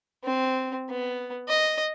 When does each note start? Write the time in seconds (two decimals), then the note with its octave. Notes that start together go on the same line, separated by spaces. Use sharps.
0.24 C4
0.89 B3
1.48 D#5